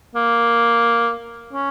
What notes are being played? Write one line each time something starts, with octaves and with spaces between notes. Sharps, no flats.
A#3
C#4